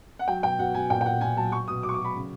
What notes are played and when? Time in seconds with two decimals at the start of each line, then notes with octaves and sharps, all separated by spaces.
0.19 F#5
0.28 F#3 G5
0.43 B2 G5
0.59 B2 F#5
0.74 B2 G#5
0.90 A#2 G5
1.01 G5
1.05 A#2 F#5
1.21 A#2 G#5
1.37 F#3 A5
1.52 F#3 C#6
1.68 B2 D#6
1.83 F#3 D6
1.89 C#6
1.94 D6
1.99 F#3
2.05 B5
2.15 C#3